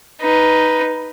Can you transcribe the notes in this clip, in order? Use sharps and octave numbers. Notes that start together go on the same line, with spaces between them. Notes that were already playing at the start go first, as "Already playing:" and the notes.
D#4 B4